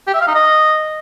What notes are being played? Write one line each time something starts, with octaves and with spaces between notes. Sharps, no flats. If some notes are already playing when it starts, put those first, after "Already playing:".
G4
E5
F5
D#4
D#5